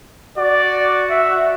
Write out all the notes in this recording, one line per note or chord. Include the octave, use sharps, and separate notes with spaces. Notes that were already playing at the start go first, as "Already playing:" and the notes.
F#4 D5
E5